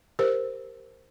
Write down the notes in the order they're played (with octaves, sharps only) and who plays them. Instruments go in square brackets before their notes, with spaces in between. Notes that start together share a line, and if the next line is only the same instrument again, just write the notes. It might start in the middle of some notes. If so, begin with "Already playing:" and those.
[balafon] G4 A#4 C5